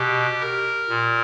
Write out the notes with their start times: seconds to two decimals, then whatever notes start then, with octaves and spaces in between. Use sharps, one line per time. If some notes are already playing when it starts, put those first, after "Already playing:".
Already playing: B2 G4
0.40 A#4
0.89 A#2